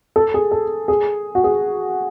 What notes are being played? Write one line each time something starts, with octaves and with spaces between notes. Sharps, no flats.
A4
G#4
A4
G#4
F#4
G#4